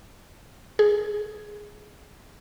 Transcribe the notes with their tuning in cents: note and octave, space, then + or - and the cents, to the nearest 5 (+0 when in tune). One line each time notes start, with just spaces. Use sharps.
G#4 +5